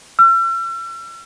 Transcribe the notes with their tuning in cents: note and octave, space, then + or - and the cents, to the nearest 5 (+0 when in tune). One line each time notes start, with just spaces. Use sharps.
E6 +45